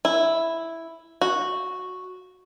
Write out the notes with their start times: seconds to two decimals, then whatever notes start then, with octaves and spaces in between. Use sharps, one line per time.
0.05 E4
1.21 F#4